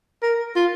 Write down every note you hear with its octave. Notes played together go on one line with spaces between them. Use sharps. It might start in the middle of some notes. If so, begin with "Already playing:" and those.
A#4
F4